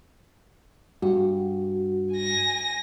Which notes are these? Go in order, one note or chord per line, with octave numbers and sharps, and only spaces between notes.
G2 F#4
G#5 A#6